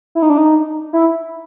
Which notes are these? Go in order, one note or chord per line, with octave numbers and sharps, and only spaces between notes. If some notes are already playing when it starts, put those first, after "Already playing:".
E4
D#4
D4
D#4
E4